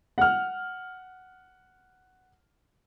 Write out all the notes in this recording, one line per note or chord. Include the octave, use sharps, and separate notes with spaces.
F#5 F6